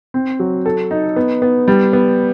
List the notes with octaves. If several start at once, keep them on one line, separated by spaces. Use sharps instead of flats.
C4
F#3
A4
D#4
B3
B3
G3
B3